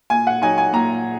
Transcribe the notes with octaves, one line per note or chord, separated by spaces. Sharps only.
A#2 G#5
F#5
F#3 D#4 G#5
G#5
A#2 A#5